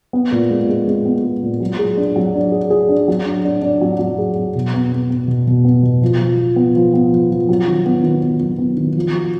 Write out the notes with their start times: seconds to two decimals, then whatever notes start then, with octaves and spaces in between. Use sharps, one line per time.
0.13 B3
0.32 A#2
0.50 G#3
0.69 G#3
0.87 G#3
1.05 B3
1.24 G#3
1.42 A#2
1.61 F#3
1.79 G#4
1.97 D4
2.16 F#3
2.35 D4
2.52 G#4
2.70 G#4
2.89 D4
3.08 F#3
3.26 D4
3.45 D4
3.62 D4
3.81 F#3
3.99 F#3
4.18 G#4
4.36 F#3
4.55 B2
4.74 B3
4.92 B3
5.10 B3
5.28 B2
5.47 B2
5.65 B3
5.83 B2
6.02 F3
6.20 F3
6.38 F3
6.56 B3
6.76 F3
6.94 B3
7.12 F3
7.31 F3
7.49 F#3
7.68 D#3
7.86 B3
8.04 D#3
8.22 B3
8.41 F#3
8.58 B3
8.77 D#3
8.96 F3
9.14 F#4